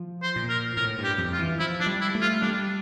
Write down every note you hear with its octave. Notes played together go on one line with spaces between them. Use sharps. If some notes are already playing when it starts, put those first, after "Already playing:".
Already playing: F3
C5
A#2
A#4
A2 A#4
G2
G4
F2
F4
E3
F3 E4
D4
G3
E4
A3
F4
G3 D4